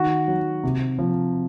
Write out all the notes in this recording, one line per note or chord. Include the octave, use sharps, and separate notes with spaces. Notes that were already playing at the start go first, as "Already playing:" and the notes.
Already playing: D#3 F#4
F#3
C3
F3